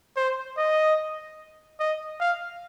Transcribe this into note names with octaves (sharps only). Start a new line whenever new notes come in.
C5
D#5
D#5
F5